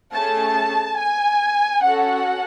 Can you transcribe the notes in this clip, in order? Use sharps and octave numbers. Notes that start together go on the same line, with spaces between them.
A3 C#4 G#4 A5
G#5
C#4 F#4 A4 F#5